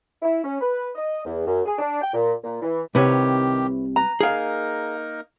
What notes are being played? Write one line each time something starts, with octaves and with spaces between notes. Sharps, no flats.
E4
C#4
B4
D#5
E2
F#2
G#4
D4
G5
A#2
A#2
E3
C2 C3 D#3 G4 B4 C#5
B4 A#5
A#3 D#4 G#4 A#4 F5